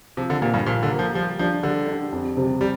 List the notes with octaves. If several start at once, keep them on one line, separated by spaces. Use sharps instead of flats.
C3 F3
D3
A#2 A#3 G4 A#4
G2
A#2 F3
D3
A#3 G4 A#4
F3
F3 G3
F3 D4 G4
D3 G3
D4 G4
F2
C3 G3 C4 G4
G3